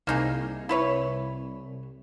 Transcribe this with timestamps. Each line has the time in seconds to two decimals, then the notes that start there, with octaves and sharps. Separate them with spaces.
0.07 C2 A#3 D#4 G#4
0.69 E4 B4 C#5